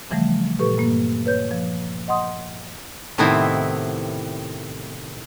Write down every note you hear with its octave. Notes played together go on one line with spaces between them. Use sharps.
C#3 E3 F3 G3 A3
A#2 G4 A4 B4 C#6
G2 A#3
B4 C#5 G6
F3
D#5 F#5 C6 D#6
A2 C3 D#3 B3 C4 E4